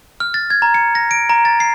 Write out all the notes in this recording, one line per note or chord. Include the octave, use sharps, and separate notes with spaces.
F6
A6
G#6
A#5
C#7
A#6
D7
A#5
A6
C7